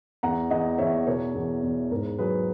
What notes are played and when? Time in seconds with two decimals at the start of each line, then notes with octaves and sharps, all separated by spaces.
0.23 E2 F#5 A#5
0.50 E2 D#5 F#5
0.78 E2 C#5 E5
1.07 B2 A#4 C#5
1.35 E2
1.63 E2
1.91 G#2 A#4
2.19 F#3 G#4 B4